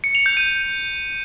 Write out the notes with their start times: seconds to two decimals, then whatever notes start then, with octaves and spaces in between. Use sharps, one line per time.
0.04 C#7
0.15 F7
0.26 G6
0.37 D#7